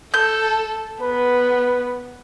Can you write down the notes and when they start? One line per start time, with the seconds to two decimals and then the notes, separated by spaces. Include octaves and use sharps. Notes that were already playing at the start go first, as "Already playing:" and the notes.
0.14 A4 G6
1.01 B3 B4